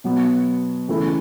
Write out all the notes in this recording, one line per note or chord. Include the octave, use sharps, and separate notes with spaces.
B2 F#3 B3
C#3 E3 A3 E4